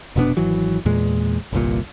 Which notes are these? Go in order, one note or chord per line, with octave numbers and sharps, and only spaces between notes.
F1 B2 B3 D4
G#1 E3 F#3
E2 A#2 G#3
G1 C2 A#2